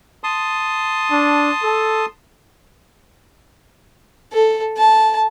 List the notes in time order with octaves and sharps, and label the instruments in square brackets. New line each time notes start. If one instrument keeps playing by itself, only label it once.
[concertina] A5 C6 D#6
[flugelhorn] D4
A4
[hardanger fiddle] A4
A5